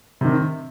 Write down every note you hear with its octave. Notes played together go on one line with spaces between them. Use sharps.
C3 D#3